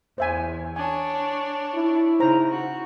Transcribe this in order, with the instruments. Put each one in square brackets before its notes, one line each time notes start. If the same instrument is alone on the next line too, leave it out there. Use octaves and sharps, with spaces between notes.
[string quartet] E2 [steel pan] C5 E5 G#5
[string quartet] D4 C#5 [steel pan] G#5
[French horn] E4
[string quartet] C#3 [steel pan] D#4 C5 A#5
[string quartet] F#4